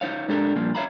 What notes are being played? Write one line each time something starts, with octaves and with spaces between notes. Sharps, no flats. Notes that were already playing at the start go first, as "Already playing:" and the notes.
D#4 C5 C#5 F5
G#2 D4 G4 A4 A#4
A#2 F3 G3 A#3
C#5 D5 E5 F5 A#5 B5